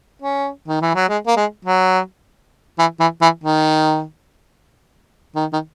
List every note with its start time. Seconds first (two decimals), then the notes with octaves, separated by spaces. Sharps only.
0.22 C#4
0.68 D#3
0.81 E3
0.95 F#3
1.09 G#3
1.27 A#3
1.37 G#3
1.65 F#3
2.79 E3
3.00 E3
3.21 E3
3.44 D#3
5.36 D#3
5.53 D#3